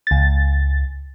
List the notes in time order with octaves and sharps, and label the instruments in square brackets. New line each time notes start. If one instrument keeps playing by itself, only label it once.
[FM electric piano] C#2 A6